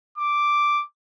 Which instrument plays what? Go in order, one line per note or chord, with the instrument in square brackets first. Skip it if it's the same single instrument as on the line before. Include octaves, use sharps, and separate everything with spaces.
[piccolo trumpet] D6